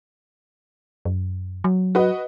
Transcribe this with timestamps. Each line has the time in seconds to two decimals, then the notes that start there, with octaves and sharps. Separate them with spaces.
1.05 F#2
1.64 F#3
1.95 F#4 B4 D#5